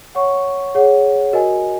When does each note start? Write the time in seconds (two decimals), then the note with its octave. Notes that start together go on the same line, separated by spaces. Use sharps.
0.15 C#5 F#5 C#6
0.75 G#4 C#5 F#5
1.33 F#4 A#4 D#5 G#5